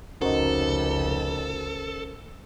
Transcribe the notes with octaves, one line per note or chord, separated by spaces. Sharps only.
F1 C#2 C#4 D#4 F#4 A4 A#4 C5